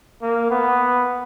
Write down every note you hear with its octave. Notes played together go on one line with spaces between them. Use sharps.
A#3
B3